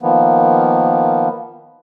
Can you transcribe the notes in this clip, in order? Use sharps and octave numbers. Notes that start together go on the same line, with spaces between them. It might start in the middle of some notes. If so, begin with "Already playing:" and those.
D#3 F3 A#3 B3